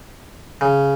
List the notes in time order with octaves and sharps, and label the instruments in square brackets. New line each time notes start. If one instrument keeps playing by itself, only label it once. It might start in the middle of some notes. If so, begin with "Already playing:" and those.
[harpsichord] C#3